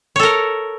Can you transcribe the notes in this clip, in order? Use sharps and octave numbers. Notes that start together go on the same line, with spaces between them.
A4 A#4 C#5